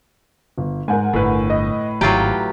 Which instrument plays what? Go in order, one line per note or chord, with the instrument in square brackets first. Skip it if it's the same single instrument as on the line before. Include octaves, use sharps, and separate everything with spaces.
[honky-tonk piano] G1
[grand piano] G#2 [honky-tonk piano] A#4 F#5 G#5
[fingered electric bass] G1 [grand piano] A2 B4
[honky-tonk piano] D#5
[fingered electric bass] G#1 [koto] F#3 F4 G4 [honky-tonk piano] E4 A5 A#5